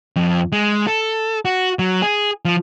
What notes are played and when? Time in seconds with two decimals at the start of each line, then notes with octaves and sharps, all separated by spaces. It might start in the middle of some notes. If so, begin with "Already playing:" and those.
0.16 F2
0.52 G#3
0.87 A4
1.45 F#4
1.79 F#3
2.02 G#4
2.45 F3